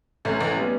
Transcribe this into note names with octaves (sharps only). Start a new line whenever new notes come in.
A1 A3 C#4
A1
G3 B3